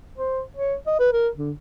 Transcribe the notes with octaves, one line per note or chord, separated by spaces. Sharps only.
C5
C#5
D#5
B4
A#4
D3